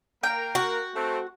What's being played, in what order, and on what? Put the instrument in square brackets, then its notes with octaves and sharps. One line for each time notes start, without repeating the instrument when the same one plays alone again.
[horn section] A#3 A#4 [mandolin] G5
[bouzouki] F#4
[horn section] A3 C4